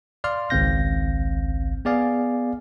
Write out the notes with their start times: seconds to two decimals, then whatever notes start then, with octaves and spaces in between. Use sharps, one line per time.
0.24 D5 F5 C6 F6
0.50 G#1 C#2 C4 F5 G6 A#6
1.85 B3 G#4 D5 F5 G#5